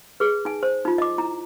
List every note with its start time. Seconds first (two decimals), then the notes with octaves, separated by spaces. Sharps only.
0.20 G#4 B4
0.45 D#4 G#5
0.63 C5
0.85 D#4 F4
0.98 D#5 D6
1.18 E4 A#5